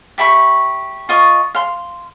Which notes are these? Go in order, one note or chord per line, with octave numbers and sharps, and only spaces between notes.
G4 E5 B5 C#6
F4 D#5 C#6
F5 C6